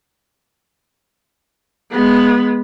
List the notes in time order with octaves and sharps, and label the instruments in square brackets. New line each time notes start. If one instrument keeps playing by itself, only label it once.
[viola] G#3 B3